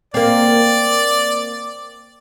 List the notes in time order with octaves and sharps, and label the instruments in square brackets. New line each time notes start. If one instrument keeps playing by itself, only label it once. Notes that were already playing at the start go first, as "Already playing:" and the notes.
[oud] A#3 C4 [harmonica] D5